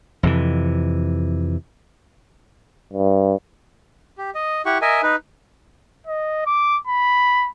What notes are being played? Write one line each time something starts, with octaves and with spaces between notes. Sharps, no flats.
F2 C3 E3
G2
G4
D#5
E4 G4 F#5 C#6
A#4 D#5 E5 G#5
D#4 B4
D#5
D6
B5